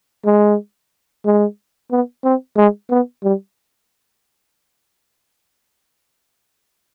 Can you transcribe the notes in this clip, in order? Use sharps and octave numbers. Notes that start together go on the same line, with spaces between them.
G#3
G#3
B3
C4
G#3
B3
G3